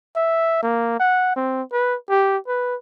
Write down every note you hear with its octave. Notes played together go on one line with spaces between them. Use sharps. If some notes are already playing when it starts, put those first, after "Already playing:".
E5
A#3
F#5
C4
B4
G4
B4